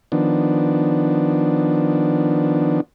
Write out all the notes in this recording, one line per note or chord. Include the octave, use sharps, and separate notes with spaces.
D#3 F3 B3 D4